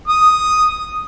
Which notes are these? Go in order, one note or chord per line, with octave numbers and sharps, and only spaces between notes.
D#6